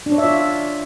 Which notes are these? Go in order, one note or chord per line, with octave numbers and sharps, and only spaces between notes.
D4
C#5
E5
F4